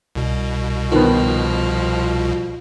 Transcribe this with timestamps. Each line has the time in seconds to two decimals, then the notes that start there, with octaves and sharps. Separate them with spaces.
0.15 C2 B2
0.92 D#3 F3 B3